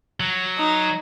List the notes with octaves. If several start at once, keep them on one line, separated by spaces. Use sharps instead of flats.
F#3
D#4